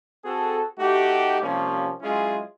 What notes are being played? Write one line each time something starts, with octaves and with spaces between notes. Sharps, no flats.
C4 F#4 G#4 A4
A3 D#4 F#4 G4
C3 F3 G3 A#3 C#4
F#3 G#3 C#4 E4 F4 G#4